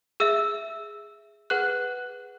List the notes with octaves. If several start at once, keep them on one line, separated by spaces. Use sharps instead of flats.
G#4 E5 E6
G#4 B4 F#5 F#6